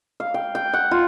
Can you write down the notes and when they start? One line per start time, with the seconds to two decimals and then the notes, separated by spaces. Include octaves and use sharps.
0.20 F5
0.34 G5
0.55 G5
0.74 F#5
0.91 F4